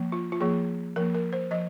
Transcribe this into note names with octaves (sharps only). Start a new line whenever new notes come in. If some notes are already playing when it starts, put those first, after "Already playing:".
Already playing: F3 A#3
F4
F4
F3 A#3 G#4
F3 A#3 A#4
A#4
C5
F3 D#5